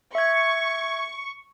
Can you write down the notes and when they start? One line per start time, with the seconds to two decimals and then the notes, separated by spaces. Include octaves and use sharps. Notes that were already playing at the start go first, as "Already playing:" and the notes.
0.15 E5 C#6 G#6